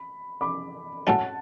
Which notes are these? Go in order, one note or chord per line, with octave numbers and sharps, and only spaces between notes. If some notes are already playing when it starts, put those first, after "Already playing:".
Already playing: B5
B5 D6
A2 F#3 C#4 F#5 A5